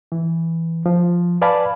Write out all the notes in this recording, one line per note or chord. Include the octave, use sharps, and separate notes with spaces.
E3
F3
B4 D5 F5 G#5 A5 B5